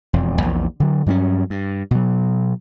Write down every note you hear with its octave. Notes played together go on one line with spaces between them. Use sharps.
E1 F2
A#1 E2
D3 F#3
G2 F#3 C4 C#4
G2
B2 F#3